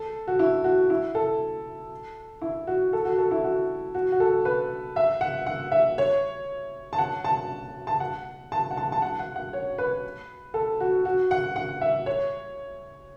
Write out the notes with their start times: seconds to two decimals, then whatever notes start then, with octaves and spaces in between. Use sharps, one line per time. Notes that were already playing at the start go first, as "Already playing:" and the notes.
Already playing: A4
0.27 F#4
0.39 E4
0.64 F#4
0.90 E4
1.15 A4
2.41 E4
2.67 F#4
2.93 A4
3.05 F#4
3.18 A4
3.31 E4
3.44 F#4
3.94 F#4
4.12 F#4
4.20 A4
4.45 B4
4.96 E5
5.21 F#5
5.46 F#5
5.72 E5
5.98 C#5
6.93 A5
6.98 F#5
7.24 A5
7.87 A5
8.00 F#5
8.52 A5
8.71 F#5
8.77 A5
8.92 A5
9.02 F#5
9.19 F#5
9.36 F#5
9.53 C#5
9.78 B4
10.54 A4
10.80 F#4
11.05 F#4
11.31 F#5
11.56 F#5
11.81 E5
12.06 C#5